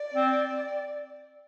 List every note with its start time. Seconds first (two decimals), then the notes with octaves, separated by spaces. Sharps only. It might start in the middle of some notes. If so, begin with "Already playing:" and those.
Already playing: D5
0.14 C4